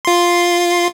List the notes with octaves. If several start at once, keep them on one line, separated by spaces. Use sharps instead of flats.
F4 C6